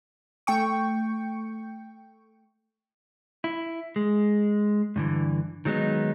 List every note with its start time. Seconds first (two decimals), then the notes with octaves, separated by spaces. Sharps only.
0.47 A3 G5 C#6
3.44 E4
3.96 G#3
4.96 G2 D3 E3
5.65 D#3 F#3 G#3 B3 D#4